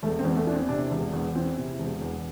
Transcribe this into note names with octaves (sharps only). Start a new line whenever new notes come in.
E1 A3
C4
E2
A3
E3 D4
C4
C3 D4
E1
E2
E3 C4
C3
E1
E2